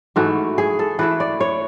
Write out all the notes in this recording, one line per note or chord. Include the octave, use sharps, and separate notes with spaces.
G#2 E3 A3 F#4
G#4
A4
E3 A3 E4 B4
D5
C#5